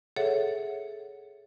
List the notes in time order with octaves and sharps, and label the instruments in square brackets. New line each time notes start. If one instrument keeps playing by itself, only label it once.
[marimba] G#4 A4 C#5 E5 F#5